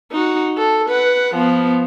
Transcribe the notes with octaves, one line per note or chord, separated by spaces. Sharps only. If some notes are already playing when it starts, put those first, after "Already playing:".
D#4 F#4
A4
B4 F#5
F3 B3